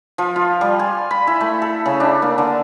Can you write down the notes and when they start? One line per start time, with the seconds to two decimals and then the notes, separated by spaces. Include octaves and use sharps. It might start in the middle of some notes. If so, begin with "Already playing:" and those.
0.18 F3
0.36 F4
0.61 G3
0.79 G#5
1.11 B5
1.27 E4
1.41 A3
1.62 A4
1.86 C#3
2.00 D4
2.22 A#3
2.38 D3